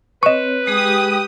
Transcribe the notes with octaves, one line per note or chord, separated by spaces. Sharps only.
C4 B4 C#5 D#5 C#6
G#3 G4 G#4 D#6